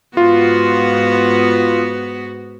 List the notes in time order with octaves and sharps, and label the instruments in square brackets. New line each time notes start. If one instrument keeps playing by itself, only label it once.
[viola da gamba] G#2 B3 F#4 [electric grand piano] F4